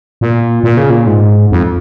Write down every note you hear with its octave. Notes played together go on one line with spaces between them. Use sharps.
A#2
A#2
C#3
A#2
G#2
F2